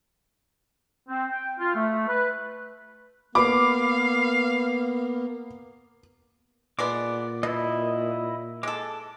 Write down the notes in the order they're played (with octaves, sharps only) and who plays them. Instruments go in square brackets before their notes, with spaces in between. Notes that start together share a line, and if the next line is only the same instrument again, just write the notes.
[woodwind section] C4
G5
F4
A3
B4
[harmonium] A#3 B3 [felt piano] B4 B5 [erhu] F5 [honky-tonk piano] D6
[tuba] A#2 [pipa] G#3 B3 D5 [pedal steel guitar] D6
[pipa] B2 [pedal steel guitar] E4 D#5
[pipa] G#3 A4 [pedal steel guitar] D6